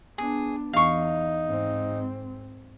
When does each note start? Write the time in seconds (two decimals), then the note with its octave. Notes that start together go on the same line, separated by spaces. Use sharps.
0.18 B3 D4 G#4
0.73 E2 D#4 F5 C#6
1.47 G#2 C4